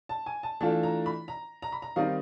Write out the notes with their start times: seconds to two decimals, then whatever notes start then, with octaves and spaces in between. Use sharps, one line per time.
0.09 A5
0.26 G#5
0.43 A5
0.60 E3 A3 D4 F4 A5
0.83 A#5
1.06 B5
1.28 A#5
1.62 A#5
1.72 B5
1.82 A#5
1.96 D#3 G3 C4 D#4 F5